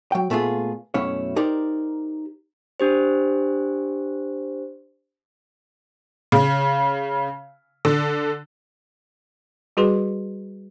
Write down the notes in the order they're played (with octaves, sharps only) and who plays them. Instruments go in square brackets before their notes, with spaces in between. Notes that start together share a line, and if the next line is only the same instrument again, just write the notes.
[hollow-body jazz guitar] F#3 G5
A#2 A3 B3 F4 G#4
F#2 B2 A3 C#4 E4 C#5
D#4 G4 A#4 C5 D5
[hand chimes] D4 G4 C5
[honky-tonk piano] C#3
D3
[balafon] G3 F#4 G#4 B4 C6